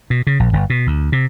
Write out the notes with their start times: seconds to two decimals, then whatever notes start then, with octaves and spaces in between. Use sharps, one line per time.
0.10 B2
0.27 C#3
0.40 A#1
0.53 G1
0.70 B2
0.87 D2
1.12 C3